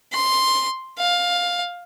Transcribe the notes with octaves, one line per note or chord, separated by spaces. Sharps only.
C6
F5